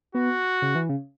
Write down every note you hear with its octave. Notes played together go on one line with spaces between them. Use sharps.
B3 F#4
C#3
E3
C#3